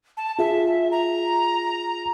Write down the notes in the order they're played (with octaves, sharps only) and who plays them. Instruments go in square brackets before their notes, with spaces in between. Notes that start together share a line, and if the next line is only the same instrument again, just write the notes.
[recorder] A5
[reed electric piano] F4 G#4 [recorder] E5
[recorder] A#5